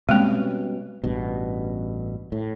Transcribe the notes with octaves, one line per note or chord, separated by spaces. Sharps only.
B2 G3 G#3 A#3 C4 C#4
A1 G2 B2
A2